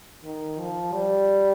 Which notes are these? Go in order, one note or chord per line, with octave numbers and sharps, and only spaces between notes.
D#3
F3
G3